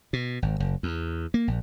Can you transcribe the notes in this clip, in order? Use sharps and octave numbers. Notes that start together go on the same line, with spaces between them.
B2
G#1
F#1
E2
A#3
A#1